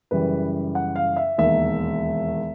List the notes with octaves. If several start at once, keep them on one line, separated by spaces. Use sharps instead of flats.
F#2 C#3 E3 G3 B4
F#5
F5
E5
E1 D#2 D#3 E5